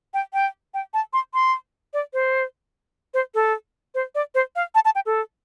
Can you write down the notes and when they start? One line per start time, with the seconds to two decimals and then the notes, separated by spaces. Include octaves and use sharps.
0.14 G5
0.33 G5
0.74 G5
0.94 A5
1.13 C6
1.34 C6
1.94 D5
2.13 C5
3.14 C5
3.35 A4
3.95 C5
4.15 D5
4.35 C5
4.56 F5
4.75 A5
4.85 A5
4.95 G5
5.06 A4